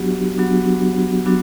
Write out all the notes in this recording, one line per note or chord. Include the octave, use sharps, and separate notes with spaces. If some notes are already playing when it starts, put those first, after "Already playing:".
Already playing: F#3 B3 D4 F#4 G4
F#3 B3 D4 F#4
F#3 B3 D4 F#4